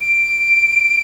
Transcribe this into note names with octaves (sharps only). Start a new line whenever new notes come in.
D7